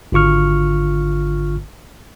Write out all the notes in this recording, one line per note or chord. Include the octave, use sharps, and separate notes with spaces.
G#1 D3 F4 C#6 F6